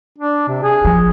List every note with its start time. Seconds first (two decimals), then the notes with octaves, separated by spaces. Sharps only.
0.19 D4
0.48 C3
0.63 G#4
0.85 F3